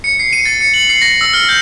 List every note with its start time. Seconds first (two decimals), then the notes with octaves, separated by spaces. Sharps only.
0.04 C#7
0.19 C7
0.33 D#7
0.45 A6
0.61 C#7
0.74 F#7
0.89 C7
1.01 A#6
1.21 E6
1.33 F6
1.49 G6